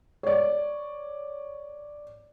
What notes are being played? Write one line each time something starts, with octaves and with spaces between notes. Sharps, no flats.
C#5 D5